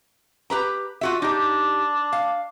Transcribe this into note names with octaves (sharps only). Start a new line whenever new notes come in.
G4 B4 A#5
F4 F#4 E5
D4 D#4 G4
F5